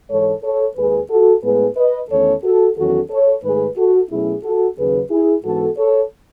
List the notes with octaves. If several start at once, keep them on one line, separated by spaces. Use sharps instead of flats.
G#2 E3 G#3 A4 C#5
A4 C#5
D#2 D#3 G#3 G#4 B4
F#4 A4
A2 G#3 B3 G#4 B4
B4 D#5
E2 D#3 A3 C#4 A4 C#5
F#4 A4
E2 D#3 F#3 C#4 F#4 A4
A4 C#5
G#2 D#3 A3 G#4 B4
F#4 A4
B2 F#3 A3 C#4 E4 G#4
F#4 A4
D#2 C#3 F#3 C#4 G#4 B4
E4 G#4
G#2 E3 B3 F#4 A4
A4 C#5